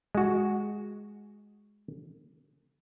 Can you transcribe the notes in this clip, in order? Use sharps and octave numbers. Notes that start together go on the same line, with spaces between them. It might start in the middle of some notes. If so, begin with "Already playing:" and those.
G#3 F#4